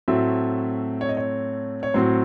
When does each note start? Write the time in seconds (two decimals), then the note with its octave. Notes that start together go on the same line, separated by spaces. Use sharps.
0.08 A2 F#3 A3 C4 E5
1.01 C#5
1.09 D#5
1.17 C#5
1.83 C#5
1.94 A2 F#3 C4 C5